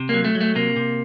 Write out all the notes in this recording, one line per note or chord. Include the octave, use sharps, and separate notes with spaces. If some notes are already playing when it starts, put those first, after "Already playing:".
Already playing: C3
F#3 A#3
A3
F#3
A3
C3 A#3
C3